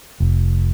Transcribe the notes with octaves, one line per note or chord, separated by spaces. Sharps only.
F1